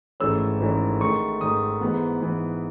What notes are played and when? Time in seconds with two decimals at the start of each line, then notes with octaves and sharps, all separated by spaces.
0.20 G#1 G#2 E3 A3 C#4 E6
0.60 G#1 G#2 E3 A3 C#4
1.01 G#2 D#3 A3 C#6
1.41 G#2 D#3 A3 D#6
1.81 G#2 E3 B3
2.21 G#2 E3 B3